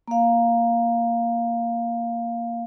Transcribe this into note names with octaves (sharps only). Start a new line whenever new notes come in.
A#3 F5